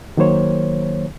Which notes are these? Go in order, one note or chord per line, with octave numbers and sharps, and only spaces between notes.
D#3 F#3 A#3 C5 C#5